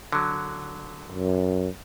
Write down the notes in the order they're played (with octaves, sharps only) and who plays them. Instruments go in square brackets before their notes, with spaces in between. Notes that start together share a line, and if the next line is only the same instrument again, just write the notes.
[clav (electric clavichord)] D3 F#3
[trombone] F#2